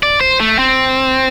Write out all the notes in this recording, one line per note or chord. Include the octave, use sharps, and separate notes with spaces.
D5
C5
A3
C4